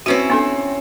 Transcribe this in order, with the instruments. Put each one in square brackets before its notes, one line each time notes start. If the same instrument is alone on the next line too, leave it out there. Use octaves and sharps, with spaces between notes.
[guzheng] C4 C#4 E4 [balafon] F#4 B4
[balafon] B3 D4 A4